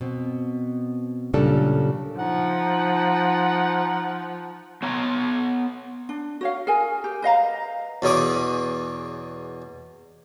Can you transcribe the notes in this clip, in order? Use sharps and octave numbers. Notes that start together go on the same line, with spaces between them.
B2 C4
F#2 A#2 C#3 G3 D4 A4
F3 D#4 F#5
B3 C#5 A#5
D4
F#4 C#5 F5
G#4 A#4 G#5
G4
B4 D#5 F5 A#5
E2 B2 C#4 G#4 D6